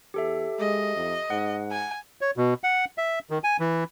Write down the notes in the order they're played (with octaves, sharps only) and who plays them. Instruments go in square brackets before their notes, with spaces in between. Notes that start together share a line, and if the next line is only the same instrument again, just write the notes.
[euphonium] E2 [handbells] G4 A4 E5
[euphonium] G#3 [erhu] D#5
[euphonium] F2
[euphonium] G#2 [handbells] F#5
[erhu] G#5
[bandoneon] C#5
B2
F#5
E5
D#3
G#5
E3